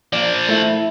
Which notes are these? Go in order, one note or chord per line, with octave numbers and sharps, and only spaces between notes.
F3 A#3 D5
A3 E4